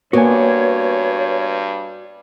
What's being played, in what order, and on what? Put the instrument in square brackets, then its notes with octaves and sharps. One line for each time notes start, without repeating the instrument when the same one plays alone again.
[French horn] G2 [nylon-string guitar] A#3 B3 [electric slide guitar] F#4 G#5 [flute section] C#5